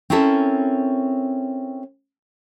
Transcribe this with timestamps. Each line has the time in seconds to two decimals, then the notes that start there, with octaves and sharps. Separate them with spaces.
0.10 C4 C#4 E4 F#4 A4 A#4